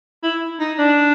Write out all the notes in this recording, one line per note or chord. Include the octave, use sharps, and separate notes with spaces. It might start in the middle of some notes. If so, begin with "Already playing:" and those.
E4
D#4
D4